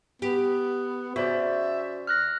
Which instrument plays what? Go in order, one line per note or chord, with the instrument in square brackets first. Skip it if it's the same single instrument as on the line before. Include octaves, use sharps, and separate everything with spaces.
[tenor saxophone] B3 [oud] G4
[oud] C#3 [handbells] F#4 C5 D5 [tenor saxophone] E5
[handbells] F6 F#6 A#6